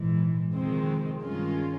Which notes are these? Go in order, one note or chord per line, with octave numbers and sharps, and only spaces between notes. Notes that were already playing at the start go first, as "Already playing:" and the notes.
Already playing: A#1 G#2 E3
F2 C3 D#3 G#3 C4
G2 D#3 G#3 C#4 F4